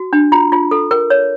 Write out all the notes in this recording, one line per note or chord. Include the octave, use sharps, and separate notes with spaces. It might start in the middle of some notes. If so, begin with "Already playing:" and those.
Already playing: F#4
D4
F4 A#5
F4
A4
A#4
C#5